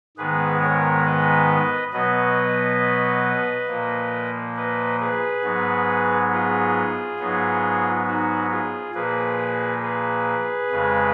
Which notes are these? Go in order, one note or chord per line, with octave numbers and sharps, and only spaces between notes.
G#2 D#3 G#3 B3 G#4 B4
A#4 C#5
B4 D#5
B2 F#3 B3 B4 D#5
A#2 F3 A#3
B4 D#5
G#4 B4
G#2 F#3 B3
F4 G#4
G#2 F#3 B3
D#4 F#4
F4 G#4
A#2 F3 A#3 G#4 B4
G#4 B4
F2 C#3 G#3